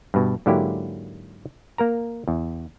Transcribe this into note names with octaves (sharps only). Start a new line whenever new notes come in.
G2 B2
G#2 D3 F#3 A#3 E4 G4
A#3 A#4 A#5
E2